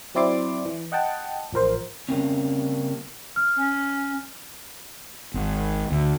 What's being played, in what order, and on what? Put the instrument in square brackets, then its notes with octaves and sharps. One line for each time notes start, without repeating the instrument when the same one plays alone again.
[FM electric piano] F#3 C4 E4 D5 C6 D6
E3
D#5 F#5 G5 A5
A1 F3 A#4 C5
[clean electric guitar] C#3 G3 G#3 A#3 C4 C#4
[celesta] F6
[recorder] C#4
[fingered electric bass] G#1
D2